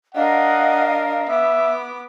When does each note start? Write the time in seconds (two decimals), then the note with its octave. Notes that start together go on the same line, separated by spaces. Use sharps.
0.15 D4 A#4 D#5 F5 F#5
1.29 B3 E5 D6